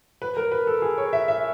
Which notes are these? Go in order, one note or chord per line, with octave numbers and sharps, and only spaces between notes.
B4
A#4
B4
A4
G#4
C#5
E5
E5